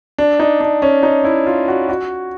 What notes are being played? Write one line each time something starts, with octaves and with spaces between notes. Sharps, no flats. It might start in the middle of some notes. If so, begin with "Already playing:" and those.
D4
D#4
D4
C#4
D#4
E4
F4
F#4
F#4